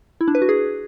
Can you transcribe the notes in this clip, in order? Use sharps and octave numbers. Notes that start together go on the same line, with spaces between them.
E4
D4
B4
F#4
G#4